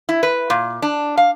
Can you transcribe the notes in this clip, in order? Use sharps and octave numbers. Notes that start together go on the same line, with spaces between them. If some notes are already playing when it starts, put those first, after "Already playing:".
E4
B4
A#2
D4
F5